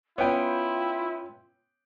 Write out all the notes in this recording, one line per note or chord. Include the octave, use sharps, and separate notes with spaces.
B3 C#4 E4 F4 C#5 G5